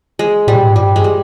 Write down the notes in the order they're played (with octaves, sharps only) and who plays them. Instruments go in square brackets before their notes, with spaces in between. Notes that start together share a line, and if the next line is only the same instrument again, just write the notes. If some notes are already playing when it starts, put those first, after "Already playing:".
[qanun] G#3
[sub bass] A2 [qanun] G3
[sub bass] A#2
A2
G#2
[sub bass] G2 [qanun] G3
[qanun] G#3
G3